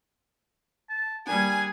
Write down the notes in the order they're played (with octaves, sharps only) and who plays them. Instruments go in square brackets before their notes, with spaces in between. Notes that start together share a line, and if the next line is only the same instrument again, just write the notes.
[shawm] A5
[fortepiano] G3 A#3 D4 [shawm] G#4 [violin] G#5